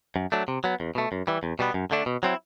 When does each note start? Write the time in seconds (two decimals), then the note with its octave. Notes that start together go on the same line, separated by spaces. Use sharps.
0.16 F#2
0.32 F#3 A3 D4
0.48 C3
0.64 F#3 B3
0.80 E2
0.95 B2 A3
1.12 F#2
1.27 E3 G3
1.43 E2
1.59 B2 G3 B3
1.74 F#2
1.91 D3 A3 D4
2.06 B2
2.23 F#3 C4 E4